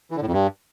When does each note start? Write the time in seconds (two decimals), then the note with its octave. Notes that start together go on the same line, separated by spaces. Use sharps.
0.11 E3
0.16 D3
0.22 A2
0.27 F2
0.33 G2